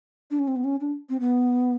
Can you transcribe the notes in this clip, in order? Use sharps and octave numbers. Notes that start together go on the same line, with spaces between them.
D4
C#4
C4
B3
C#4
D4
C4
B3